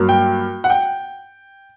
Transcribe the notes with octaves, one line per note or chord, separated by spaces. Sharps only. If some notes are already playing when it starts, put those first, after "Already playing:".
Already playing: G2 F#3 A#3
G5
F#5
G5